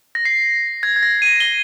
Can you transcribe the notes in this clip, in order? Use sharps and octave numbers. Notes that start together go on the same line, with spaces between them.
A#6
C7
G#6
G#6
A#6
D#7
G7